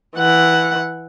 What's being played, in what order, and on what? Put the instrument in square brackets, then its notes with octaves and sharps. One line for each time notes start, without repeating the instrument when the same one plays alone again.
[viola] E3 F#5